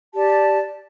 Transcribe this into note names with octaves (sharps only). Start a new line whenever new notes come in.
G4 D5 A5